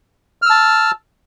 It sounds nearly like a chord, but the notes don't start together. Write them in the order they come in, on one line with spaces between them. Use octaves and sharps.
F6 E6 A5